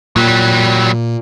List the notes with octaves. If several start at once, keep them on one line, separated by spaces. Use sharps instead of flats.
A#2 F#3 G3